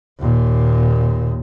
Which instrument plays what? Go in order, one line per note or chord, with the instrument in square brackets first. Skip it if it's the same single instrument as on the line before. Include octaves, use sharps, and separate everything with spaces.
[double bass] D#2 A#2